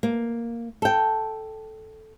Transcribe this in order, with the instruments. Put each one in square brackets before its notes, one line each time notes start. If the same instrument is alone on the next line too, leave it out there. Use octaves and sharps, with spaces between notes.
[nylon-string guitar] A#3
A4 G5